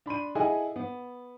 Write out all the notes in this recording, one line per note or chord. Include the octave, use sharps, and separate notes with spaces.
D4 B5 C6 D#7
E4 G#4 A4 D#5 F#5 G#5
B3